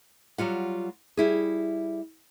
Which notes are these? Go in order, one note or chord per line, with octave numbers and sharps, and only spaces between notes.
F#3 G3 F4 F#5
G3 E4 G#4